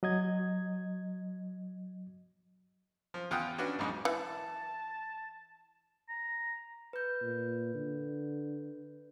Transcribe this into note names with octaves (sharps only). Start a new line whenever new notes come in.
F#3 D#5 G#6
F3
E2 F4 F#5 G5 D#6
C#4 D4 F#4 B4 F#5
B1 F2 G#2 G#3 D#4
E3 A5
A#5
B4 G6
A#2
D3